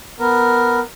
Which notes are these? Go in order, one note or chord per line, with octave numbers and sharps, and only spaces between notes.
B3 A#4